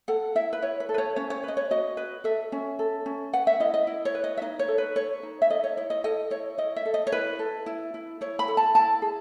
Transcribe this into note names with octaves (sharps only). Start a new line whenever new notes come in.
A4 F#5
E4 E5
B4
E4 C#5
B4
A4
B4
C#5
C#4 C#5
C#5
B4 D#5
C#5
F#4 D#5
B4
A4 E5
C#4
A4
C#4
B4 F#5
E5
E4 D#5
D#5
E4
C#5
B4
D#5
E5
D#4 D#5
C#5
A4
B4
A4 C#5
D#4
E5
A4 D#5
C#5
E4 C#5
D#5
A4 D#5
E4 C#5
E4 D#5
E5
A4
D#5
C#5
E4 B4
A4
E4
E4
E4 C#5
B5
A4
A5
E4 A5
G#4